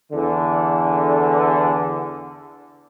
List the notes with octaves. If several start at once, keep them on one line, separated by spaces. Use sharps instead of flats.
E2 D3